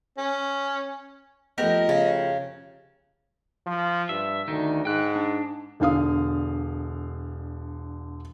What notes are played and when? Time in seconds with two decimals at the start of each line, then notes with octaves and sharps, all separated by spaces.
0.18 C#4
1.58 F3 A3 B3 F#4 G4 A#4 D#5
1.89 C#3
3.66 F3
4.09 G2 E5
4.48 D2 D#3 D#4
4.85 G#2 G5 F#6
5.16 D4
5.80 E1 D3 F5 D#6